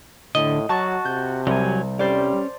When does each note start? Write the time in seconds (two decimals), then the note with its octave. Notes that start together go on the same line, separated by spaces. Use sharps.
0.35 A2 D3 D#5
0.69 F#3 F#4 A5 C#6 A6
1.05 C3 G6
1.47 C2 F#3 G4 G#5
1.99 G3 C#4 C5 D5